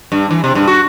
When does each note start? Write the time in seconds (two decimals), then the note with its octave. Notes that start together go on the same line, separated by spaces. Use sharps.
0.12 G2
0.31 E3
0.44 C3
0.55 G2
0.67 F#4